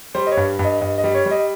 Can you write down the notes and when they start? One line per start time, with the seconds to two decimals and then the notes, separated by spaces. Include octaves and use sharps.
0.15 G3 C5
0.27 D#5
0.32 C#5
0.37 G2
0.59 G2
0.65 D#5
0.81 G2 D#5
0.98 D#5
1.04 G3
1.14 C#5
1.26 G3
1.31 D#5